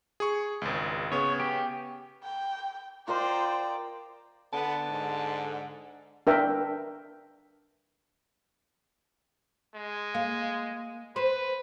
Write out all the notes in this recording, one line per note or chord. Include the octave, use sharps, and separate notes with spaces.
G#4 C#6
G#1 C#2
C#3 B3 C#5
G4
G5
F4 A#4 C5 D5 D#5 G5 A#5
D3 B3 A5
G#2
D4 A#4 B4 E5 G5
G#3
A#3
B4 C5